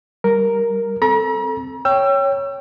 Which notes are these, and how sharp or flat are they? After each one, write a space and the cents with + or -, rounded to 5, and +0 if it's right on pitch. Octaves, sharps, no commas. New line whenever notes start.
G3 -10 A#4 +0
C4 +0 A4 +0 A#5 +40
C#5 +0 G5 +0 E6 +35